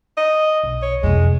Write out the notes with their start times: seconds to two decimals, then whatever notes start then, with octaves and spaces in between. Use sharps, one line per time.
0.17 D#5
0.63 B1
0.83 C#5
1.03 F2 C3 G#3